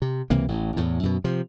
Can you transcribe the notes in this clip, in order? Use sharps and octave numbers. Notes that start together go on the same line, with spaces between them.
C3
C#2 C3 E3 A#3
A1 A2
E2 A2
F#2 B2
C3 F3